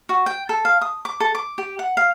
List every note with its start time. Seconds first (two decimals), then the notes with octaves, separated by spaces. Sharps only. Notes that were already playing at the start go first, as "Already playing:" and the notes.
0.09 F#4
0.26 G5
0.49 A4
0.65 F5
0.81 D#6
1.05 D6
1.20 A4
1.35 D6
1.58 G4
1.79 F#5
1.97 F5